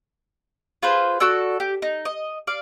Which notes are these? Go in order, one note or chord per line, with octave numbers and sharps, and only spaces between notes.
F4 G#4 B4 C5
F#4 A4 D5 E6
G4
D#4
D#5
D5 F5